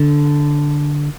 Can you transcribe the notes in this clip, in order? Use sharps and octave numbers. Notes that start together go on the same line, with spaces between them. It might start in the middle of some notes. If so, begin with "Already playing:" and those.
Already playing: D3